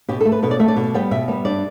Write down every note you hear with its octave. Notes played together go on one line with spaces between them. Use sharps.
B2 G4
A4
A3
B4
B2 B4
D5
A3 E5
D5
B2
G3 B3 G5
B2 E5
G3 B3
G2 D5